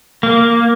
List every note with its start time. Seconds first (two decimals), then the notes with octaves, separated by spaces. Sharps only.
0.23 A#3